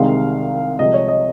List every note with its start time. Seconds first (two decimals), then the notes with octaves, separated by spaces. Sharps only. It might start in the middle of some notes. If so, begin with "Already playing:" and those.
Already playing: C2 C3 D#3 G#3 F5
0.79 C2 C3 F3 G#3 D#5
0.94 C#5
1.08 D#5